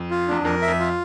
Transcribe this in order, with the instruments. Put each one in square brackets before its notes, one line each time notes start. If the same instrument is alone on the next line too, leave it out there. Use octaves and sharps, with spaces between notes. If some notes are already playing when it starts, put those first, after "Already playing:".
Already playing: [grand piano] F2
[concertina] F4
[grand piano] E2 [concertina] D4
[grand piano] F2 [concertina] A#4
[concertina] E5
[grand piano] F2
[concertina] F4